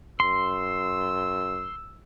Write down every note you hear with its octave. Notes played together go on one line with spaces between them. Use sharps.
F#2 C6 E6